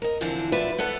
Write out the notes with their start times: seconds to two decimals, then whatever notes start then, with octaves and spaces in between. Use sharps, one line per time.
0.02 A#4 D#5
0.21 E2 D3 E3 F3 C4 D4
0.52 F4 F#4 B4 D5 E5
0.78 B3 A4 B4 D5 F#5